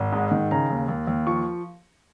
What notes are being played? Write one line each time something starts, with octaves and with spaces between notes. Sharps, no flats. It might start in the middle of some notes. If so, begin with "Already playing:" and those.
Already playing: G#1
G#2
D#3
C#3 A#5
D#2
D#2
D#2
F3 C#6